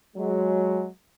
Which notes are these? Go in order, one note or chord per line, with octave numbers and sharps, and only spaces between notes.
F#3 G#3